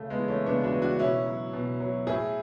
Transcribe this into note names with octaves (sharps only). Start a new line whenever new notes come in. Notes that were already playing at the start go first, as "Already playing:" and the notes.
Already playing: C#3 A3
G#3 B3
E3
A3 C#4
C#3 B3 D4
D4 F#4
E3
D4 F#4
B2 C#4 E4
F#3
B2
F#3
A2 E4 G#4